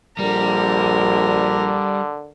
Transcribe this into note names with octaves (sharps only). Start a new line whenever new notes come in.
A#1 D3 G3 A#4